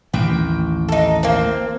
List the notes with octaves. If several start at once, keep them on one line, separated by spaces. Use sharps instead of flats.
A1 D#2 G5
D#4 A4
A#3 C4